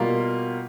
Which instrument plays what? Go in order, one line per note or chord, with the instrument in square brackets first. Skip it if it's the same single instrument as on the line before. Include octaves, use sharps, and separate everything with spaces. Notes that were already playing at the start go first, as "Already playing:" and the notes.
Already playing: [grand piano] B2 G3 A#3 F4